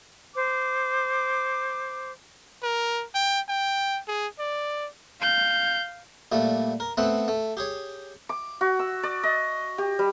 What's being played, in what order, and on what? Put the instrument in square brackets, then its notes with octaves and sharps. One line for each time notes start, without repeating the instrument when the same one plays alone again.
[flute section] C5 D6
[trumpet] A#4
G5
G5
G#4
D5
[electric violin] F5 G6
[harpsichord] A#2 G3 A3
A#4
A3 B3 C4 F#5
A3
G4 G#4 C#5
[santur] D6
F#4
E6
D5
D#5
G4
G3